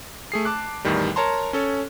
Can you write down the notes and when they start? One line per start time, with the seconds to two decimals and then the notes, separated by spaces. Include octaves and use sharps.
0.32 A3 G#4 C7
0.45 A5 D6 F#6
0.85 E2 A2 D#3 G3
1.16 A#4 C#5 A5 A#5 C6
1.53 C#4 A4 C#5